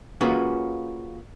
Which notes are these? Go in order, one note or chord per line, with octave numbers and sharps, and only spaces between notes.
A#3 C#4 F4 F#4 G#4 B4